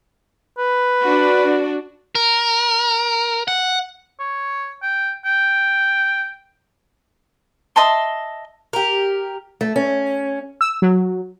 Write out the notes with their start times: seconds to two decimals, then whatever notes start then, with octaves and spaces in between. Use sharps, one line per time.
0.58 B4
1.02 D4 F#4
2.15 A#4
3.48 F#5
4.20 C#5
4.82 G5
5.25 G5
7.76 D#5 E5 A5 C6
8.73 G4 A#4
9.61 A3
9.76 C#4
10.61 E6
10.82 F#3